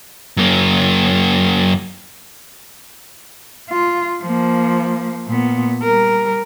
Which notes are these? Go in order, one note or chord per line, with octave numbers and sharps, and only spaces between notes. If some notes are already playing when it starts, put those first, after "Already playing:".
F#2 A#3
F4
F3 A#3
A#2 B3
G3 A#4